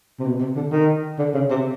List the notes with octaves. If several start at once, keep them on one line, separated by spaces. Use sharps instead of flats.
C3
B2
C3
D3
D#3
D3
C#3
C3